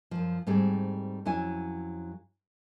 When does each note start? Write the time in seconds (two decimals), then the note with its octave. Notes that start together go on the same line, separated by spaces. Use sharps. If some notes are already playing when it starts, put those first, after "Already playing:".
0.11 F#2 F3
0.47 G#2 G3 A3 C4 G#4
1.25 F2 F#3 C#4 E4 G#5